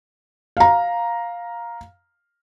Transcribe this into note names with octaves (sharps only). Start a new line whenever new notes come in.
F5 A#5